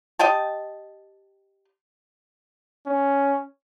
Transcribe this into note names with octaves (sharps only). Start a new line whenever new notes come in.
G4 D#5 G5 A5
C#4